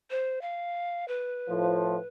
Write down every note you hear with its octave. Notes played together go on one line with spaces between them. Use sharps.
C5
F5
B4
A2 F3